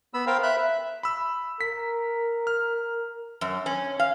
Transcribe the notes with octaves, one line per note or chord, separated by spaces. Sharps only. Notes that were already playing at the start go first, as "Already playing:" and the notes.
B3 B5 E6
A#4 C5 F5 G5
E5 B5 F#6
E5
B5 E6
A#4 B6
F6
F#2
C#4
F5